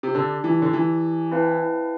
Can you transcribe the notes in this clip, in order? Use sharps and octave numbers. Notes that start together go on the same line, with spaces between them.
C3
D3 G4 D5 A5
E3
D3
E3
C4 E4 B4 F5 A5